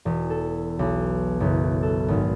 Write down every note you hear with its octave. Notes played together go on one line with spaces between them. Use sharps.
E1
A4
B1
F#1
A4
G#1